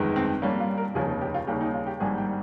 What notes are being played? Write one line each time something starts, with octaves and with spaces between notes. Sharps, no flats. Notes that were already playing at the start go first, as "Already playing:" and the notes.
Already playing: G1 F2 D#3 G#3
C4
G2 G3 A#3 C#4
F4
A#4
F1 D#2 C#3 F3 G#4
G4
F4
D#2 C#3 G3 A#3 G4
D#4
F4
G4
G#1 G2 G3 A#3 G#4
G5